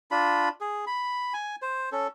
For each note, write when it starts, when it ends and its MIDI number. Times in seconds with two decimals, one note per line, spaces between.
0.11 0.49 62
0.11 0.49 65
0.11 0.49 83
0.61 0.85 68
0.87 1.33 83
1.34 1.56 80
1.62 1.90 72
1.92 2.07 61
1.92 2.07 69